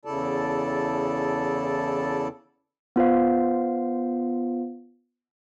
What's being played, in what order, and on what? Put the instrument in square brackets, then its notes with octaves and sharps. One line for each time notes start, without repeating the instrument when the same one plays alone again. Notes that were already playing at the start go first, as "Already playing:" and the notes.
[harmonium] E2 C#3 E4 A4 D5 A5
[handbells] B3 F4 C5 F5